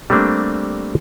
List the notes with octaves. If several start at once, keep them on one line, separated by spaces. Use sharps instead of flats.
G3 A3 A#3 C4 D4